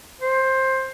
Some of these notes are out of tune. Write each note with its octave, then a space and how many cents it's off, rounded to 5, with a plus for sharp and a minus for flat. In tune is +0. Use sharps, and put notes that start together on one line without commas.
C5 +15